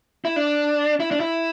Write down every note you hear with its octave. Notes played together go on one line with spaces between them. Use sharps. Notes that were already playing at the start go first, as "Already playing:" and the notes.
E4
D4
E4
D4
E4